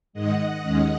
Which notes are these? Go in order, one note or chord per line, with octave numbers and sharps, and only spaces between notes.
G#2 D#3 G#3 D#5 F#5
D#2 D#3 G#3 C#4